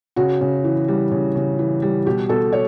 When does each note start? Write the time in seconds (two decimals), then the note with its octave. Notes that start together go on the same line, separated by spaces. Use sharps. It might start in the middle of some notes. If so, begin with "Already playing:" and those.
0.16 C#3 F#4
0.41 C#3
0.64 E3
0.88 G3
1.12 C#3
1.36 C#3
1.59 E3
1.82 G3
2.06 B2 G4
2.29 B2 A4
2.53 C#5